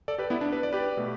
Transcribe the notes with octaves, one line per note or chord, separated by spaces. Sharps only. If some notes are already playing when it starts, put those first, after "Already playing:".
A4 D5
G4 B4
B3 E4
D4
B4
D5
G4 B4
B2 A3